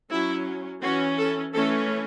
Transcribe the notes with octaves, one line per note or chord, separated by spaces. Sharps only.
F#3 C#4 E4
E3 C#4 F#4
A4
E3 A3 C#4 A4